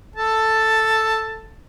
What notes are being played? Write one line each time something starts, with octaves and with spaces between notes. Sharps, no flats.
A4 A5